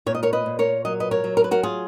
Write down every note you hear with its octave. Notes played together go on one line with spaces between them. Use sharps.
A#2 C#5
D#5
A#4 C#5
B4 D#5
A#2
A#4 C#5
F#3 D#5
B4 D#5
A#4 C#5
F#3
A#4
B4
F#4 A#4
F4 G#4